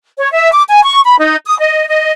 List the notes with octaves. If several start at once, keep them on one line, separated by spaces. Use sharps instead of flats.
C#5
E5
D6
G#5
C#6
B5
D#4
D#6
D#5
D#5